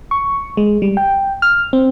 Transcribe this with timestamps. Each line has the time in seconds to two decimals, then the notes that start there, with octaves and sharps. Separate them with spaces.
0.11 C#6
0.57 G#3
0.82 G3
0.97 G5
1.42 F6
1.73 C4